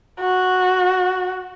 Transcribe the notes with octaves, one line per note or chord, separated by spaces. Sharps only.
F#4